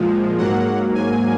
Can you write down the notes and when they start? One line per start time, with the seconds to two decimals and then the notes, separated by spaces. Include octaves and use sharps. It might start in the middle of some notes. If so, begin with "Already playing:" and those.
Already playing: A#2 F3 G#3
0.38 G#2 F#3 A#3 F#5
0.95 G#5